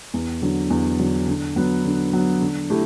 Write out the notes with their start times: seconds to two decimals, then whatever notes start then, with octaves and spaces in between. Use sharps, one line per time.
0.14 E2
0.42 D3 F#3
0.70 E2
0.99 D3 F#3
1.27 D3
1.56 F#3 B3
1.85 D3
2.13 F#3 B3
2.42 D3
2.70 A3 E4 G4